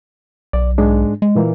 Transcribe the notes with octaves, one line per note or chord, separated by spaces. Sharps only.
B1 D5
G#2 G#3 D4
G#3
A#2 E3 A#3